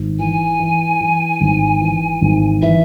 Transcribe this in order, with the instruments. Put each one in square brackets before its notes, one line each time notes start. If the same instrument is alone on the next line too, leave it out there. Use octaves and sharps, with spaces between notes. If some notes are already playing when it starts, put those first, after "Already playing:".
Already playing: [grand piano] G#1
[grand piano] E3 [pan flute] G#5
[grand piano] E3
E3
G#1
E3
G#1
[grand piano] E3 [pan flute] E5